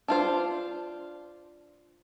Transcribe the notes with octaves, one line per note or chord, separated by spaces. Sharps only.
D4 F4 C5